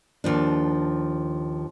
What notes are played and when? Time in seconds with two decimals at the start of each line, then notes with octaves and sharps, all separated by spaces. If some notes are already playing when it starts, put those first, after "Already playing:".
0.24 D#2 F3 D4